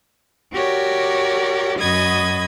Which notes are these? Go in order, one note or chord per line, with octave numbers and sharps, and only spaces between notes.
F#4 G4 A#4 C#5 D5
F#2 F#4 D#5 B5 D#6 G#6